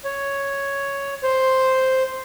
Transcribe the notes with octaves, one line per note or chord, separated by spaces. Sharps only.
C#5
C5